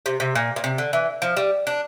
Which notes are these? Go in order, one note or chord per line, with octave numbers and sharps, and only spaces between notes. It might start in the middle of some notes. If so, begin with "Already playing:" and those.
C3
C3
A#2
A#2
C3
D3
E3
F3
G3
D4